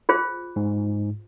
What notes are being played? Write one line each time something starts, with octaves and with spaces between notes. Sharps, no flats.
F4 G#4 C5
G#2